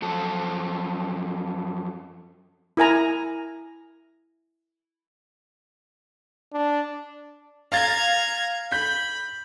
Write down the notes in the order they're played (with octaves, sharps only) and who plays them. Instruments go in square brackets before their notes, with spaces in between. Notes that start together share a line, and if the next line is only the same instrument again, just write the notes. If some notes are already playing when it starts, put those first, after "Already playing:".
[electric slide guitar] F#2 F3 A4
[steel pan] E4 A#4 G#5 A#5
[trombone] D4
[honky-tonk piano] F5 A6 [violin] A#5 G#6
[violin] B5 [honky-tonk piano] G6 B6